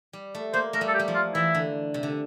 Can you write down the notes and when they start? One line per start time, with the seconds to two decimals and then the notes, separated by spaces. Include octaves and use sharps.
0.13 G3
0.35 A3
0.53 A#3 C5
0.73 A3 A#4
0.81 G3
0.88 A4
0.94 G4
0.99 G3
1.08 F3
1.15 F4
1.35 E3 E4
1.54 D3
1.94 C3
2.03 D3